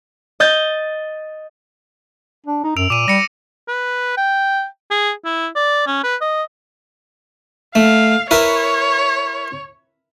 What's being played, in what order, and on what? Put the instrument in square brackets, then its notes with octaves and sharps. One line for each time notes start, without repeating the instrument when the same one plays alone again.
[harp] D#5 G6 A6
[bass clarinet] D4
D#4
[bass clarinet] F#2 [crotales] E6 D7 F7
[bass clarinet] A#2 [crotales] D6 D#7
[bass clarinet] G3 [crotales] A#6 C#7 D#7
[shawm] B4
G5
G#4
E4
D5
C#4
B4
D#5
[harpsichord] A3 [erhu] F5
[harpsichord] E4 A#4 B4 [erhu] C#5